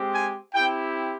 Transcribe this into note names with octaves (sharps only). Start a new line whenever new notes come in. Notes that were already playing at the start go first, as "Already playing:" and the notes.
Already playing: G#3 C4 G4
G#5
C4 E4 G4 G5